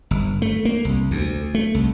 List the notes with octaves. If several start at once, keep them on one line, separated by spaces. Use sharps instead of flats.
G1
A3
A#3
C2
D2
A3
C2